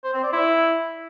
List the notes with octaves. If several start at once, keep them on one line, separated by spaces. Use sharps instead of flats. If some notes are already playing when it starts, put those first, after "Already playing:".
C5
C4
D5
E4